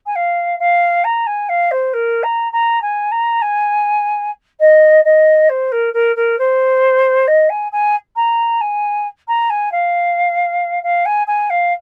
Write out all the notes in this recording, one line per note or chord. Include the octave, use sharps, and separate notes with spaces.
G#5
F5
F5
A#5
G#5
F5
C5
A#4
A#5
A#5
G#5
A#5
G#5
D#5
D#5
C5
A#4
A#4
A#4
C5
D#5
G#5
G#5
A#5
G#5
A#5
G#5
F5
F5
G#5
G#5
F5